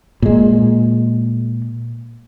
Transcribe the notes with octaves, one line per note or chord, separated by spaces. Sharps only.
A#2 G#3